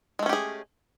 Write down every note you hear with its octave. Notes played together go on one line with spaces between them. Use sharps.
G#3 A3 C#4 G4 G#4